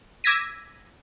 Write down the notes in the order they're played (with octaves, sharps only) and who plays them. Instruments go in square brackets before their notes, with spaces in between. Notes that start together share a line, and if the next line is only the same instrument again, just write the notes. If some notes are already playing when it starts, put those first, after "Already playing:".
[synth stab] D6 E6 G#6 A#6 B6 D#7